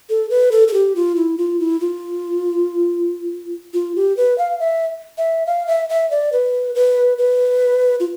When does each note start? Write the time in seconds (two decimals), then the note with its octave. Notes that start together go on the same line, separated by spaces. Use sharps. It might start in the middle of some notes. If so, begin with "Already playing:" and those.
0.09 A4
0.30 B4
0.52 A4
0.68 A4
0.74 G4
0.96 F4
1.16 E4
1.38 F4
1.60 E4
1.80 F4
3.74 F4
3.96 G4
4.17 B4
4.38 F5
4.60 E5
5.18 E5
5.46 F5
5.67 E5
5.89 E5
6.11 D5
6.33 B4
6.75 B4
7.18 B4
8.00 F4